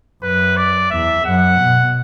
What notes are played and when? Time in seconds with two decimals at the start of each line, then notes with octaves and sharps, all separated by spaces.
0.23 F#2 B4
0.57 D5
0.91 E2 E5
1.25 F#2 F#5
1.60 B2